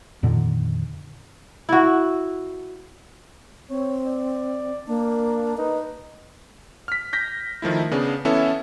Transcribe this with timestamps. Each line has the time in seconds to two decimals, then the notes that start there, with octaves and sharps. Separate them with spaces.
0.23 F2 A#2 D3 D#3
1.69 E4 F#4
3.70 C4 C#5
4.05 D5
4.88 A#3 D4
5.58 D#4 B4
6.88 F6 B6
7.13 G6 A#6 B6
7.62 D#3 F3 A3 E4
7.91 C#3 B3 D4 G#4
8.25 E3 B3 C#4 E4 A4 E5